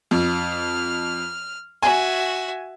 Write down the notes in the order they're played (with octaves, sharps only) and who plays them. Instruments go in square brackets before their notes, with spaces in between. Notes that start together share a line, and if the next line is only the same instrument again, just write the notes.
[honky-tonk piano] F2 [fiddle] F6
[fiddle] F#4 E5 [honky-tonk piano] G#5